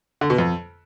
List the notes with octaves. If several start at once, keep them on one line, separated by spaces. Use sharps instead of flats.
D3
B2
F2